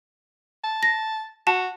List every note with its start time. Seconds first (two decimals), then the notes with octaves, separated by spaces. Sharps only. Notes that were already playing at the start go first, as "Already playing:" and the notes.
0.64 A5
0.83 A#6
1.47 F#4 A5